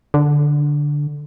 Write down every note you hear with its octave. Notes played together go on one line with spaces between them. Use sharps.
D3